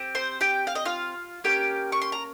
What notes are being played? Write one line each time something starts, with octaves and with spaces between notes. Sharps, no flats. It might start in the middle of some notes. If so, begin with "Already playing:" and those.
Already playing: C4 G4
C5 C6
G4 G5
F5
D#5
F4 F5
A#3 C#4 G4 G5
C#6
C6
A#5